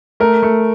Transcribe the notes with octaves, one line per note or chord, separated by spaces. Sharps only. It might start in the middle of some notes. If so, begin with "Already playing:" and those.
A3 A#4
A3